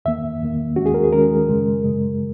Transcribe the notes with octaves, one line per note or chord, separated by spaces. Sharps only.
E2 D#3 A#3 E5
E2 D#3 A#3
D#2 D#3 G#3 C#4 F#4
G#4
A#4
G#4
D#2 D#3 G#3 C#4 A#4
F#2 C#3 G#3
F#2 C#3 G#3